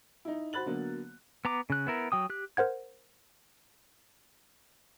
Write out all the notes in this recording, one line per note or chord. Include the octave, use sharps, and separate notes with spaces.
D#4 E4
F#4 C5 B5 F#6 A6 F#7
D3 F#3 A#3 B3
B3 A#5 D6
C#3 F#6
B3 E4 A#4
F#3 G5 D#6
G4 F#6
A#4 C5 F#5 G#6